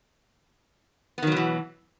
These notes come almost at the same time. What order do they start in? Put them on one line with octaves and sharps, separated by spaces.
B3 D#3 F#3 B2 E3